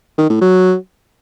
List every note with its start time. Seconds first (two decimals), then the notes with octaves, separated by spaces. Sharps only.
0.18 D#3
0.30 A2
0.41 F#3